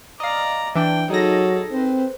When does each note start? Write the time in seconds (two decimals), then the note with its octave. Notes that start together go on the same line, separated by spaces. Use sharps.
0.20 D5 D#5 F5 A#5
0.76 E3 D4 G5
1.10 F#3 D#4 G#4 A4 A#6
1.72 C4 B4 C5